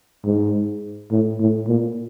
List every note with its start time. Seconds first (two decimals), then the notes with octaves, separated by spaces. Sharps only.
0.25 G#2
1.11 A2
1.40 A2
1.67 A#2